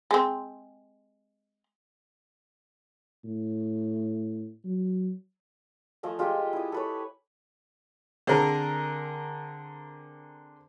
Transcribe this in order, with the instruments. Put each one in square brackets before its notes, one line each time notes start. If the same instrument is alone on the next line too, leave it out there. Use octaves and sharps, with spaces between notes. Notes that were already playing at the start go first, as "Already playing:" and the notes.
[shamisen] G#3 C4
[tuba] A2
F#3
[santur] F3 A3 D#5 G#5
G#3 F4 G4
E4 D#6
A4 B4 C#5
[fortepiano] D3 C4 G#4 A#4